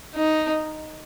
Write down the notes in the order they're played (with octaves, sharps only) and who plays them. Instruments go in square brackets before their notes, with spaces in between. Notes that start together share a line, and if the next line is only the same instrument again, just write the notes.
[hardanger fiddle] D#4